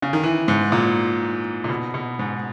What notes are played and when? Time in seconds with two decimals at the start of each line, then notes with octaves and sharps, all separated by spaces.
0.02 C#3
0.13 D#3
0.24 E3
0.48 G#2
0.72 A#2
1.64 A#2
1.69 B2
1.94 B2
2.19 G#2